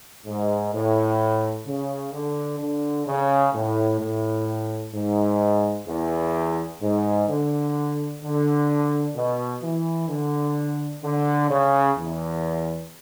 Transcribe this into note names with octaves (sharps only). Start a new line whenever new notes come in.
G#2
A2
C#3
D3
D3
C#3
A2
A2
G#2
E2
G#2
D3
D3
B2
E3
D3
D3
C#3
E2